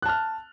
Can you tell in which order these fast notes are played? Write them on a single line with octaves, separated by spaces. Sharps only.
F#6 A5 F6